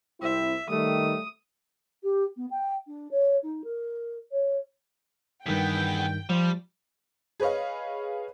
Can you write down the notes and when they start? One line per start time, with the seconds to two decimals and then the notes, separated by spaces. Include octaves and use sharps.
0.22 C2 C4 E4 E5
0.69 D#3 G3 A3 D#6
2.03 G4
2.36 B3
2.50 G5
2.87 D4
3.11 C#5
3.42 D#4
3.64 A#4
4.31 C#5
5.46 E2 G2 D#3 B3 G5 B6
6.29 F3 G3
7.40 G#4 B4 C#5 D#5 F5